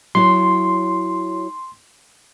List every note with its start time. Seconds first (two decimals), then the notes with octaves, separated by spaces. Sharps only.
0.15 F#3 E4 C#5 C6